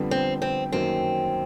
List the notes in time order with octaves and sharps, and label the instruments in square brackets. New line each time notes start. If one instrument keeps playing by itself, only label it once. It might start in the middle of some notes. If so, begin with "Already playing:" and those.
Already playing: [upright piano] F2 D3 G3 B3
[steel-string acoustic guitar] C4
C4
[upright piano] F#2 D#3 F#3 A#3 [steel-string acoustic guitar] C4